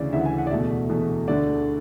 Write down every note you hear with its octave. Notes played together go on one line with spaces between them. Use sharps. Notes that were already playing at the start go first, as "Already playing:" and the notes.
Already playing: D2 C#3 E3 D5
D2 C#3 E3 E5
F#5
G#5
F#5
D5
E2 B2 A3 E5
E2 B2 A3
D2 D3 A3 D5